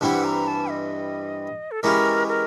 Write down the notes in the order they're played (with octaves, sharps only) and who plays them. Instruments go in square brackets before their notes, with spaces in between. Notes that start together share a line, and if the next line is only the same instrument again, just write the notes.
[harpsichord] G2 E3 G3 C4 E4 [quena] F#5 A5
[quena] A#5
A5
D#5
A4
[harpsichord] E3 G#3 C#4 E4 G4 [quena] A#4
[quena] A#4